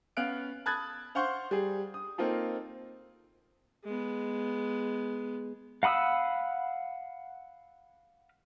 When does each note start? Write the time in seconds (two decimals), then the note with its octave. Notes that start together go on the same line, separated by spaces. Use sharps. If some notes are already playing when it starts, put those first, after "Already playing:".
0.17 B3 C#4 F5 F6 F#6 D7
0.66 A5 B5 D#6 F#6 G#6 A6
1.15 C5 F5 F#5 C6 C#6 G6
1.51 G3 G#4
1.94 D#6
2.18 A#3 C4 D#4 F4 A4
3.84 G#3 B3
5.83 F5 F#5 B5 D#6 E6